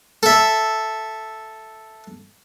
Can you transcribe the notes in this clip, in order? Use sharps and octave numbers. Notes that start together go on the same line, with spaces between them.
A4 E5